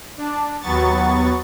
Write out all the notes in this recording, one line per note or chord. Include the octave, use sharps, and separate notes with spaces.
D4
D#2 F#3 B3 C#6 A6